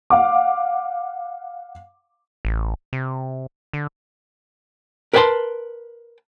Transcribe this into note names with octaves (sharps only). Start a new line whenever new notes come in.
F5 F#5 D6
A1
C3
D3
A#4 B4 C#5 G5 A5 C6